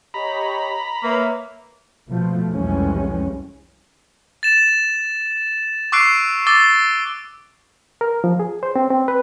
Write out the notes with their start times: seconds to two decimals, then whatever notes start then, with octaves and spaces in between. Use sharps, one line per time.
0.14 G4 C#5 D#5 A#5 B5
1.03 A#3 B4 C#5 E5
2.08 B2 F3 A3
2.51 C2 F2 E3 G3 G#3 C#4
4.43 A6 E7
5.92 C#6 D6 E6 F#6 C7 D7
6.47 D6 E6 A6 G7
8.01 A#4
8.24 F3
8.40 G#4
8.63 C5
8.76 C4
8.91 C4
9.08 B4